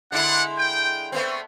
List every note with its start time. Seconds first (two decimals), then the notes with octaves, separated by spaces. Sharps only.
0.12 D3 G#3 D4 E4 F#5
0.57 G5
1.12 A3 B3 C4